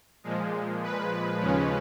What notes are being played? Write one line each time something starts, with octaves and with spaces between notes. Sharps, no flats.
A#2 F3 G#3
B4
D#2 C#3 F3 G#3 C#4